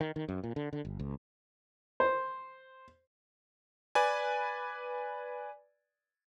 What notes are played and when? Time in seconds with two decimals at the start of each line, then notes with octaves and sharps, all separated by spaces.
0.01 D#3
0.16 D#3
0.29 F#2
0.44 A#2
0.56 D3
0.73 D3
0.85 G1
0.99 C#2
2.00 C5
3.95 B4 D5 G#5